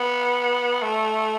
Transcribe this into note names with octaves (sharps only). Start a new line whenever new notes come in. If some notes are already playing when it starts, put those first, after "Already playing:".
Already playing: B3
A3